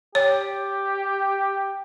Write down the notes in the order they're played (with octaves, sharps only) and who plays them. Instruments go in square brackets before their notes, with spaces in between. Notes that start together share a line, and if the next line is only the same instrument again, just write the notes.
[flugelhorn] G4 [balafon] C#5